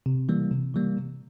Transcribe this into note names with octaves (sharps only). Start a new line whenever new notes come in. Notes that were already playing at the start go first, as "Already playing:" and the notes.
C3
E3 G3 A#3
C3
E3 G3 A#3
C3